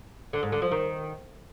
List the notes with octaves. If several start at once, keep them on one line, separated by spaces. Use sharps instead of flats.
D3
G#2
D3
F3
D#3